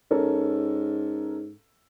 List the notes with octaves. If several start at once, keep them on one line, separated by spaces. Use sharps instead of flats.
G#2 C#4 A4 A#4